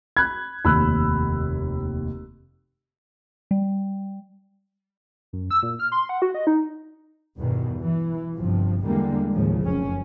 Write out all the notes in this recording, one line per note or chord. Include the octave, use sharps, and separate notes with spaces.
B5 F#6 G#6
F1 D#2 B5 E6 F#6
G3
F#2
E6
A#2
F6
C6
F#5
F#4
D#5
D#4
E2 G2 B2 D#3
E3
G1 G2 C3 F3
E2 D3 G3 G#3 A#3
D#2 A2 C#3 F3
F1 F#2 C#4